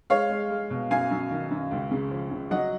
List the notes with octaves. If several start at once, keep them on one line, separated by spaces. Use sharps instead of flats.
G#3 C#5 F5
G#3
G#3
B2
F#2 F5 G#5
F#2
D#3
F#2
C#2
C#3
F3
C#3
F#3 D#5 F#5